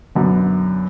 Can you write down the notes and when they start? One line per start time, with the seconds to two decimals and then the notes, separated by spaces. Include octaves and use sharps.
0.15 F#2 B2 D3